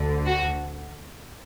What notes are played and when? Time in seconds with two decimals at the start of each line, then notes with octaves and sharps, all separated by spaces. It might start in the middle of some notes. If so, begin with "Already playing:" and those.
Already playing: D2 D3
0.26 F#4